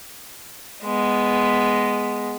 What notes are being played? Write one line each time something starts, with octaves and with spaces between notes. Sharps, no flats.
G#3 B3